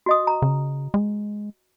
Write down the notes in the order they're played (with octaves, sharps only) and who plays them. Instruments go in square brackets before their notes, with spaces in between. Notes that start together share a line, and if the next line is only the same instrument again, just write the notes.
[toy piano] F#4 D#5 D#6
A#5
[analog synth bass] C#3
G#3